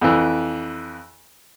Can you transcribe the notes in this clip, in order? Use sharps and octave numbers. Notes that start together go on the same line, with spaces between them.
F2 E3